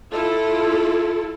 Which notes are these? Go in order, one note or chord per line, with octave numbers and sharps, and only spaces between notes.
E4 F4 A4